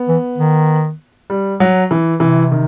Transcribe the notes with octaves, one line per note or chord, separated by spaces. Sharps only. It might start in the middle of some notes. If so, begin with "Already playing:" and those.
Already playing: B3
E3
D#3
G3
F#3
E3
C3 E3
D#3